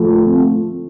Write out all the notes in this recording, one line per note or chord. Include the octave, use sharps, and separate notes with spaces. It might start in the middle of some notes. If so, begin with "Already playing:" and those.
Already playing: F3 A3
C4